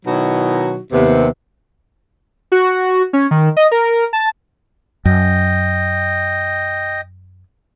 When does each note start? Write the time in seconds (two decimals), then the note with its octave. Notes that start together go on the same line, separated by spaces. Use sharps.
0.05 B2 D#3 F#3 D#4 E4 F#4
0.92 D#2 C3 B3
2.52 F#4
3.13 C#4
3.31 D#3
3.57 D#5
3.72 A#4
4.13 A5
5.05 F#2 D#5 G5